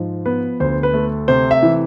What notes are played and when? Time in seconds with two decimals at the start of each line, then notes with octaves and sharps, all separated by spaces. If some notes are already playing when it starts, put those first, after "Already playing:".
Already playing: G#2 F3
0.26 B3 B4
0.60 D2 C5
0.83 B4
0.93 A3
1.28 C3 C5
1.51 E5
1.63 E3